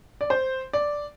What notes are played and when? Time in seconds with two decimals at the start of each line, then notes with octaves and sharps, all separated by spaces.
0.21 D5
0.30 C5
0.73 D5